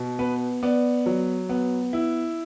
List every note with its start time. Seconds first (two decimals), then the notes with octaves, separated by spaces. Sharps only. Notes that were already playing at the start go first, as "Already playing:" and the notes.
Already playing: B2
0.19 B3 B4
0.63 B3 D5
1.06 F#3
1.49 B3
1.93 E4